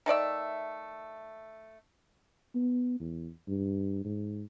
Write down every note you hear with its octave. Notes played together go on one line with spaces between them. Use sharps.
D#3 A3 D5 E5
B3
E2
G2
G#2